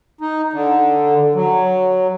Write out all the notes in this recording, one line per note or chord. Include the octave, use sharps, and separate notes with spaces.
D#4
D3
F#3